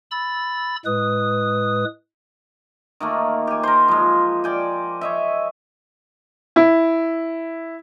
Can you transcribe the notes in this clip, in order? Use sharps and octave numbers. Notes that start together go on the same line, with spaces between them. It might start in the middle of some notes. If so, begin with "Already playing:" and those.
B5 E6 A6
A2 G#3 B4 D#6
D#3 A3 A#3
G4 G#5
A#4 C5
F3 G#3
D5 G5 G#5
C#5 D#5 E5
E4